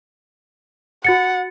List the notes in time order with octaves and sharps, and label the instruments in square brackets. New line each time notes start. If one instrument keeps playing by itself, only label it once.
[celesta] F#4 A6 C#7 [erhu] F#5